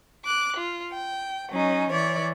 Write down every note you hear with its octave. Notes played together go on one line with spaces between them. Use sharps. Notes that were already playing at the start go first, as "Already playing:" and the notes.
D6 F#6
F4
G5
F#3 C#4 D#4
E3 C#5 D5